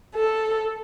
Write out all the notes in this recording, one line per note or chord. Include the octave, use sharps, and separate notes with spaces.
A4